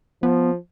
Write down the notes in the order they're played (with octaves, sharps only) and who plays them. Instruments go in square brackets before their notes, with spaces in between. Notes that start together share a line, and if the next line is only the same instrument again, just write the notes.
[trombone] F3 [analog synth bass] B3